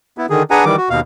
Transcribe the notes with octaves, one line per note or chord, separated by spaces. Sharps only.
B3 E4
D3 D#3 G#4
D4 G#4 B4 F#5 G#5 A#5
D#3 E3 G3 D6
F#4
D#2 B2 F5